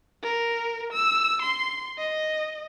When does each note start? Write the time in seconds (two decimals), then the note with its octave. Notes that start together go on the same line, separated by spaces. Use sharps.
0.23 A#4
0.93 E6
1.42 C6
1.98 D#5